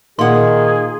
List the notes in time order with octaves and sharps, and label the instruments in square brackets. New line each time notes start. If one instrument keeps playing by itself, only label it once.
[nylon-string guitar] A#2 F#5 [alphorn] D#3 [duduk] G#4 [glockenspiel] C6